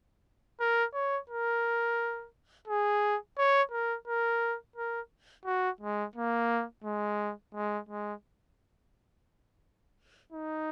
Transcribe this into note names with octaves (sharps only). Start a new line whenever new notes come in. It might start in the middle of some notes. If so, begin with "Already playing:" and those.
A#4
C#5
A#4
G#4
C#5
A#4
A#4
A#4
F#4
G#3
A#3
G#3
G#3
G#3
D#4